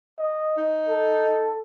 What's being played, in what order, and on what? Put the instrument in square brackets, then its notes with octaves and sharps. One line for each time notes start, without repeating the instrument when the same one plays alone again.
[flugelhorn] D#5
[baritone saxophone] D#4
[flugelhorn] A4